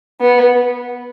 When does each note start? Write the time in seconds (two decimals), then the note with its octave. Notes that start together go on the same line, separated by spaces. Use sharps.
0.21 B3